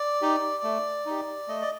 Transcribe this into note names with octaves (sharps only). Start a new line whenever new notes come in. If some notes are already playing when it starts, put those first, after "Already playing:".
Already playing: D5
D#4 G4
A3
D#4 G4
A3 D#5
D5